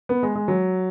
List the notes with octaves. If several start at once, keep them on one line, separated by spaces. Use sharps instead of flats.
B3
G#3
G#3
F#3